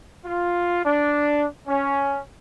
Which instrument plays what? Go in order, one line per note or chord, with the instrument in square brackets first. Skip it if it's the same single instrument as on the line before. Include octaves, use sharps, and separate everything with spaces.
[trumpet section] F4
D4
C#4